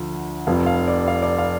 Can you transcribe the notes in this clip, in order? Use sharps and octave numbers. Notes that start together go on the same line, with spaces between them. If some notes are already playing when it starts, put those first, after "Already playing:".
Already playing: D2 D3 F3
F1 F2 F3 F5
F5
D5
F5
D5
F5